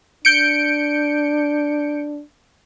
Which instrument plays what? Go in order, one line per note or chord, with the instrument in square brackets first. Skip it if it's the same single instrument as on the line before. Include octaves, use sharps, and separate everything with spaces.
[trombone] D4 [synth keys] G6 C#7 D7